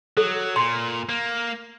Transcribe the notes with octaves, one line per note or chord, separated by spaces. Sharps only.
F#3 A4
A#2 C6
A#3